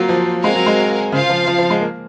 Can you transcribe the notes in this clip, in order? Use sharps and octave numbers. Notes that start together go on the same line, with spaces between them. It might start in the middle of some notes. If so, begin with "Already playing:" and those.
Already playing: F#3 A#3 F4 C5
F3
G#3 C4 F#4 A#4 F5 G#5
F#3
G#3
C#3 F4 C5 F5
F3
F3
F3
G#3
A#3